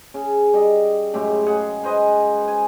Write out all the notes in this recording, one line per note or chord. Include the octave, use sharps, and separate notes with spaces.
C#3
G3 D#5
F#2 A2 G#3 G4
G#4 F#5
B4 C5 D#5 G#5
G#5